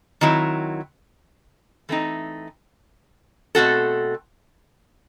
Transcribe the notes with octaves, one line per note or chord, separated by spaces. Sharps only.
D#3 F#3 C4 E4
E3 A3 C4 D#4
B2 A3 C4 F#4 A4